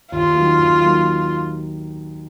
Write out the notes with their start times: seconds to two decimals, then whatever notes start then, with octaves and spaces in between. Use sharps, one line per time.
0.12 D#2 F4
0.35 D#3 F#3 A#3
0.58 D#2
0.81 D#3 F#3 A#3